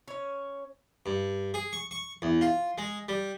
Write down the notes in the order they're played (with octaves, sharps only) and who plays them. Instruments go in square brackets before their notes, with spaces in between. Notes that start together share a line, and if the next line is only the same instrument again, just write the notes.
[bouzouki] C#4 C#5
[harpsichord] G2
G#4
C#6
C#6
E2
F4
G#3
G3